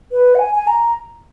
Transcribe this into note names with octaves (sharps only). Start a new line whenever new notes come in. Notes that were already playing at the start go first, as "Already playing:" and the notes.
B4
F#5
G#5
G#5
A#5